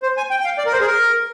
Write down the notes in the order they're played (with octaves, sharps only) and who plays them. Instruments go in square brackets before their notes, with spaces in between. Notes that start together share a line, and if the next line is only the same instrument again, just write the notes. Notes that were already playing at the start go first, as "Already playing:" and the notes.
[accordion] C5
G#5
G5
G5
F5
D5
A#4
C5
G#4
A#4